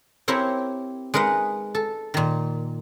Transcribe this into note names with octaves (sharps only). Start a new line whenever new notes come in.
C4 E4 G4 A#4 C#5
G#3 D#4 A#4 B4 F#5
A4
A#2 D#3